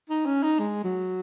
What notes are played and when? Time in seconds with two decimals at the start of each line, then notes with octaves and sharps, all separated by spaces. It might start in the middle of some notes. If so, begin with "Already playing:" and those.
0.10 D#4
0.26 C#4
0.43 D#4
0.59 G#3
0.84 F#3